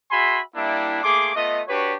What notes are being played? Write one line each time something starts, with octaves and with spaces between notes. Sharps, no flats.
F#4 G#4 E5 G#5 B5 C6
G3 A#3 D4 E4
A3 A#3 G#4 C6 D6
A3 B3 F4 D#5
D4 F#4 G4 B4 C#5